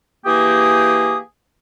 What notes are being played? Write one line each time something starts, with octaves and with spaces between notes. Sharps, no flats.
E3 A#3 G4 G#4 G5 D#6